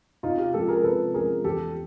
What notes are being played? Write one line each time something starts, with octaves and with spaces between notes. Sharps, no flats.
C3 D#4 F4
F4 G4
F3 G#3 C#4 F4 G4 A4
G#4 A#4
C3 A4 B4
F3 G#3 C#4 F4 G#4 A#4
E2 G4 A4